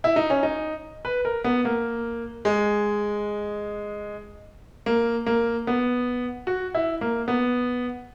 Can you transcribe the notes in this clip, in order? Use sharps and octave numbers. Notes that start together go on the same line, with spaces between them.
E4
D#4
C#4
D#4
B4
A#4
B3
A#3
G#3
A#3
A#3
B3
F#4
E4
A#3
B3